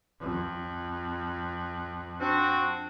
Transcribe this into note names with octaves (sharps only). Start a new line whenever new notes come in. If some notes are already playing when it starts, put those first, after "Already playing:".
F2
C4 D4 F#4